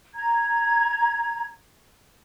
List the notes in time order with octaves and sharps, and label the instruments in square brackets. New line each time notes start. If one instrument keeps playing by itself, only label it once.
[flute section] A#5 G#6